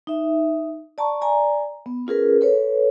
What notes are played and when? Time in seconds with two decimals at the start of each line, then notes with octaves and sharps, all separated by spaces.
0.07 D#4 E5
0.98 D5 A5 A#5 C#6
1.21 D5 G#5 A#5
1.86 B3
2.07 C#4 F4 G#4 A#4 B4
2.41 A4 B4 C#5